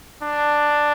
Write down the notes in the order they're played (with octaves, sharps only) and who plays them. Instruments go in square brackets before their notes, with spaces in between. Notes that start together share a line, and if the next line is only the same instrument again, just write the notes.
[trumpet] D4